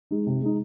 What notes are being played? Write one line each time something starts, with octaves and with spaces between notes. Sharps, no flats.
G#3 D#4
C3
G#3 D#4